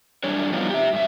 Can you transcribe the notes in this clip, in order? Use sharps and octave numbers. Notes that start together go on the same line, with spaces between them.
F#2 G3 D4 C#5
F3 G3 B3 D#4 F4
G4 E5
G2 E5